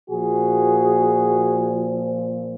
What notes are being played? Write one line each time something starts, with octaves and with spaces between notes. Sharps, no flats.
A#2 F3 F#4 G#4